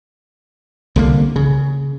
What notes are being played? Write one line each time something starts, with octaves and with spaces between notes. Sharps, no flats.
C2 D3 A#3
C#3